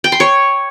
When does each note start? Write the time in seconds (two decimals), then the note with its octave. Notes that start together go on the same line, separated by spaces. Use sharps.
0.04 G5
0.12 C6
0.20 C#5